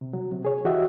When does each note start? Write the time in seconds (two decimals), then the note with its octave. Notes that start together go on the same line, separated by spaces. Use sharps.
0.01 C3
0.13 F#3
0.32 C3
0.45 G#4 C#5
0.65 E3 F#4 G4 D#5 E5